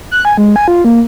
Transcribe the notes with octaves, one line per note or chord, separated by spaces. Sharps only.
F#6
G#5
G#3
G#5
F4
A#3